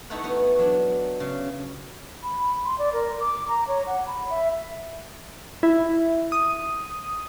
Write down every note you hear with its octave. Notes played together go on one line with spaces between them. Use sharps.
A3 D#4 E4 A4 C#5 F#5
B3 D#4 F#4
F#3 D4
C#3
B5
C6
D5
A#4
D6
A#5
C#5
F#5
B5
E5
E4
D#6